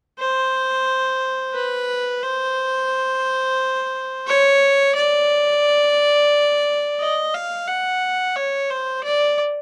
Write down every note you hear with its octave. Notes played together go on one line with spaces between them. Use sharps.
C5
B4
C5
C#5
D5
D#5
F5
F#5
C#5
C5
D5